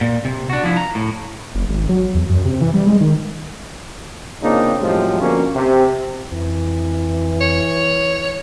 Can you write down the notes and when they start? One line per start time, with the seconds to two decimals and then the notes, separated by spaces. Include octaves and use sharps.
0.01 A#2
0.25 C3
0.50 D4 F#4
0.64 F3 E4
0.77 A#5
0.95 A2
1.55 F#1
1.69 G#1
1.89 F#3
2.15 E2
2.29 F#2
2.45 C3
2.61 E3
2.74 G3
2.86 G#3
3.01 D#3
4.43 A#2 C#3 A#3 C4 D4 D#4
4.81 C2 F#2 A2 C3 F3 G#3
5.21 B2 D3 F3 A#3 C#4
5.55 C3
6.32 F2 E3
7.41 C#5